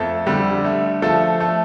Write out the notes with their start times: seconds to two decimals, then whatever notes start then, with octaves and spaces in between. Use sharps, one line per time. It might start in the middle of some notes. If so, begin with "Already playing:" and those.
Already playing: F2 A3 A4
0.26 D3 G3 G4
0.65 A3
1.02 F3 A3 A4
1.40 A3